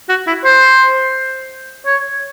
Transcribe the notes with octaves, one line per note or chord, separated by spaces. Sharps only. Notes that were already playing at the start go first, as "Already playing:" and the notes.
F#4
E4
C5
C#5